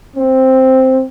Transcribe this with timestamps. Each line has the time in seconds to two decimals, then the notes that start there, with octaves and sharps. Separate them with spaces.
0.16 C4